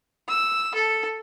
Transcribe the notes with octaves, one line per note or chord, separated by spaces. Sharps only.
E6
A4